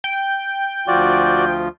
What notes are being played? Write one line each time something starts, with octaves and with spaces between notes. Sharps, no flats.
G5
D2 F3 F4 F#4 D5